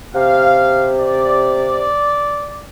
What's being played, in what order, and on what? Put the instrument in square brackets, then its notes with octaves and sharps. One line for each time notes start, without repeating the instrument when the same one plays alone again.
[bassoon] C3 [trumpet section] F5
[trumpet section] D5